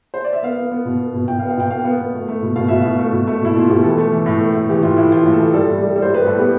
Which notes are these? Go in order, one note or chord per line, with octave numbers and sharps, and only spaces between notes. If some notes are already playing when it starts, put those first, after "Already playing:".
C5
D5
E5
B3 F5
B3
B3
B2
B3
B2
B2 G5
F5
B3
F5
B2 G5
B3 F5
B3
B3
A3
A3
B2
B2 F5
B2 E5
B2 F5
A3
B2
A3
B2 E4
B2 F4
B2 G4
E3 A4
A3
E3
A2
A3
A2
E3 G4
A2 F4
A2 E4
E3 F4
A2
A4
E3
G3 A4
A2
G3
G3
C5
G3 B4
A2 A4
B3 G4